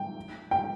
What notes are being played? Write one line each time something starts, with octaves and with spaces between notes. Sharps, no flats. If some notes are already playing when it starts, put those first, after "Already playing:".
Already playing: G5
G5